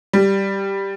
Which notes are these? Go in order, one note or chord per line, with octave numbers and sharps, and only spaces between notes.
G3